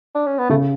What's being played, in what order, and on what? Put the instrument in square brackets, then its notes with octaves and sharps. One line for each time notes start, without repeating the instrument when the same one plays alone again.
[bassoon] D4
C#4
B3
[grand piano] C#3 [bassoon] A3